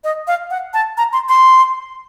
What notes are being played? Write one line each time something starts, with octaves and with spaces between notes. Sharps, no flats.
D#5
F5
F#5
A5
A#5
C6
C6